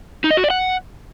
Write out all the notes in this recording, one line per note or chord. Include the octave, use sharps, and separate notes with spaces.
D#4
D#5
F#4
D5
F#5